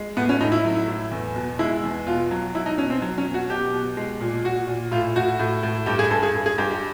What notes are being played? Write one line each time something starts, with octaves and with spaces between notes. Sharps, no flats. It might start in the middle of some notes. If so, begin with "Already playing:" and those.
Already playing: G#3
A2 B3
C#4
A2 D#4
E4
F#3
A2
E2
B2
G#3 E4
E2
B2 F4
F#3
F#3 E4
D#4
B2 C#4
C4
F#3
C#4
B2
F#4
B2 G4
B2
G#3
A#2
A#2 F#4
A#2
A2 F4
A2 F#4
A2
A2
G2 G4
G#4
G2 A4
G#4
G2
G#4
G2 G4
G4